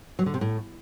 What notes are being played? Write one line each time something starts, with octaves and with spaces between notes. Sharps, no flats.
F#3
D3
C3
A2